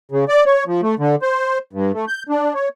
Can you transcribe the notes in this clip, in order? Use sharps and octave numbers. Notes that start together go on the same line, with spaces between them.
C#3
D5
C#5
F3
A3
D3
C5
G2
A3
G6
D4
C#5